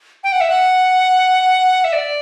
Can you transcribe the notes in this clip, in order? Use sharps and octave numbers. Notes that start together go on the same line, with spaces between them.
G5
F#5
E5
F#5
E5
D5